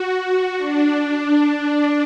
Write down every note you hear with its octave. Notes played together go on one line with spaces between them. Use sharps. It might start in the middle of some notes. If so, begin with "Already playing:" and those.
Already playing: F#4
D4